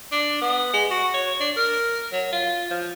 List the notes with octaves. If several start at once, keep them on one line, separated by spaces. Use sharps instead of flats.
D4
B3
G#3
F#4
C#5
D4
A#4
F#3
F4
F3